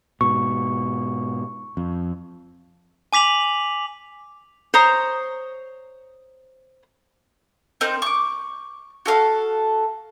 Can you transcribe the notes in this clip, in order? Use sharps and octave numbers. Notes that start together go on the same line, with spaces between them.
G#2 B2 C#6
F2
G#5 D6 B6 F7 F#7
C5 C#5 A#5 D#6
C4 D#4 A#4 G6
C#6 D6
F#4 A4 F5